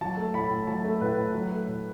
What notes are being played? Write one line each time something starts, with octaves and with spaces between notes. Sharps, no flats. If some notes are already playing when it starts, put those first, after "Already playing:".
F#3 A5
A3
A2 B5
A2
F#3 A5
A3
A2 B4
A2
F#3
A3
A2